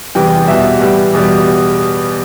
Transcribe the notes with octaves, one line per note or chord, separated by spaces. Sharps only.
E2 C3 E3 G3 G5
E2 B2 G3 E5
A2 E3 G3
E2 B2 G3